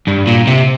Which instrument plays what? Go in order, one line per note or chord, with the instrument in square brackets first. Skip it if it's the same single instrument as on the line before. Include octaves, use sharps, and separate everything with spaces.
[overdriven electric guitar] G2
A#2
C3